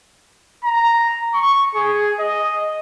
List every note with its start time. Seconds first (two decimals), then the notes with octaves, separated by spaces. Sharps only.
0.64 A#5
1.34 C#6
1.75 G#4
2.20 D#5